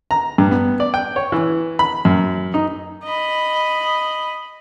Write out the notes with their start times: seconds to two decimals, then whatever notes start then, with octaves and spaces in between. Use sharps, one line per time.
0.11 A#5
0.38 G2
0.51 B3
0.80 D5
0.94 G5
1.16 C#5
1.32 E3
1.79 B5
2.05 F#2
2.54 D#4
3.05 D#5 B5